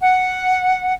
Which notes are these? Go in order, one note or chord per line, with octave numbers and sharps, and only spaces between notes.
F#5